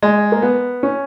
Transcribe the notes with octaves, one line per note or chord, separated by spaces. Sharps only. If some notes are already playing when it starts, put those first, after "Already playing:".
G#3
A#3
B3
C#4